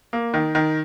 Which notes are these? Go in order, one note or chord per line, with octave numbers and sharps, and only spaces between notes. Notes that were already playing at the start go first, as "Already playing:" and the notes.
A#3
D#3
D#3